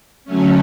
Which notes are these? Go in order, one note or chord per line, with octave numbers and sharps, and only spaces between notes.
D3 F#3 A3 C#4